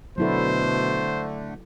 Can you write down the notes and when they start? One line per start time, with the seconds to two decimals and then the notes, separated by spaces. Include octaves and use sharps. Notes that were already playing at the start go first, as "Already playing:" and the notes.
0.18 B2 D3 F#3 A3 E4 A4 C5